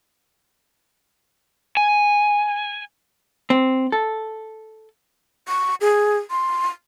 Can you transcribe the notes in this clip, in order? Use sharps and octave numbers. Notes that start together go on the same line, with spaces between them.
G#5
C4
A4
C#6
G#4
C6